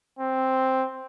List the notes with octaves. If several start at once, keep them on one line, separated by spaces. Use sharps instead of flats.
C4